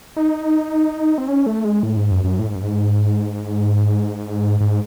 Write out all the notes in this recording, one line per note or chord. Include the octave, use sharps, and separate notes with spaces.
D#4
C4
C#4
A3
G#3
A2
G#2
F#2
F#2
A2
G#2
F#2
G#2
G#2